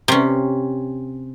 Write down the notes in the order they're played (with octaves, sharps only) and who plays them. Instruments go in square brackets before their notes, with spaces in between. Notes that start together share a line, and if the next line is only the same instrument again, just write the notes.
[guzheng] C3 C#4